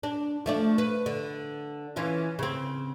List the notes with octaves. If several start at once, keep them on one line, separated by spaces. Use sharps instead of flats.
D4
F3 A3 D4
B4
D3
E3 C#4 F4
C#3 C4